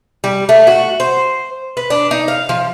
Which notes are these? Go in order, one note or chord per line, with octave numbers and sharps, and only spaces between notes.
G3
A3
F#4
C5
B4
D4
D#4
F5
F3